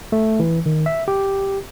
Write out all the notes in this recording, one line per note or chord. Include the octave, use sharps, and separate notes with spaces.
A3
E3
D#3
E5
G4